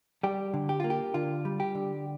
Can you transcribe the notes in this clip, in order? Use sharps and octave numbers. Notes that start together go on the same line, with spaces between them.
G3 G4
D3
G4
A#3 F4
G4
D3 F4
G3
G4
D3